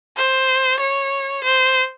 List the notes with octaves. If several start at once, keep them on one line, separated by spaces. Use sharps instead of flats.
C5
C#5
C5